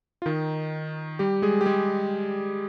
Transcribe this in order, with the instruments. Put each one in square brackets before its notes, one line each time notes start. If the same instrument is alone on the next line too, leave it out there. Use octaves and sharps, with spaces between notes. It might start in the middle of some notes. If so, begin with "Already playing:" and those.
[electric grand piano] F4
D#3 D#4
G3 G4
G#3 G#4
G4
G#3 G#4